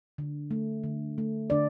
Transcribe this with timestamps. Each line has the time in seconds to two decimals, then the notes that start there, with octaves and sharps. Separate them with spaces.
0.18 D3
0.51 A3
0.84 D3
1.18 A3
1.50 D3 D4 D5